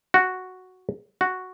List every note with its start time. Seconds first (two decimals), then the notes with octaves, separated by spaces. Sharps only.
0.14 F#4
1.21 F#4